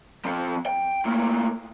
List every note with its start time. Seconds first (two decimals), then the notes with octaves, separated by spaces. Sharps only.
0.25 F3 C4
0.66 G5
1.05 A2 A#3